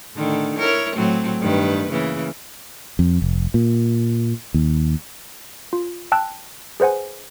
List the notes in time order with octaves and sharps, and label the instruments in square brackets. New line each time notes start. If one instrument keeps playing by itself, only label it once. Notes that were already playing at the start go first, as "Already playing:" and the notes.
[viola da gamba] A2 D3 D#3
E4 A#4 C#5
A2 F#3 C4
G2 D#3 B4
C#3 E3 A#3
[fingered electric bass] F2
F1
A#2
D#2
[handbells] F4
G5 A5 E6 F#6
G#4 B4 C5 F#5 G#5